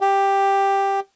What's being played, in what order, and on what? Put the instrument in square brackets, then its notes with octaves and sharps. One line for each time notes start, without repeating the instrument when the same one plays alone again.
[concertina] G4